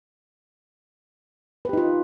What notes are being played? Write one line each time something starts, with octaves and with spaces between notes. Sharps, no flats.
D#4 F4 G4 B4